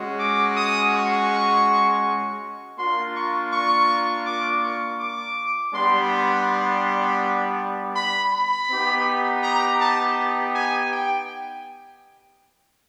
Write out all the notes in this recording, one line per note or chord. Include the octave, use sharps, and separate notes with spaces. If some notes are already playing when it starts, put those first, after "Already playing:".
Already playing: G#3 C#4 F#4
D6
D#6
C#6
A#3 D4 F4 C6
C#6
C#6
D6
C#6
D6
G3 B3 D4 C6
C6
B5
B5
B3 D#4 G4
A#5
A5
G#5
G5